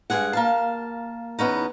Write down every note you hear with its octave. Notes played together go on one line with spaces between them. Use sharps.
G2 G#3 G#4 F#5
A#3 F5 A5
E2 B3 C#4 D#4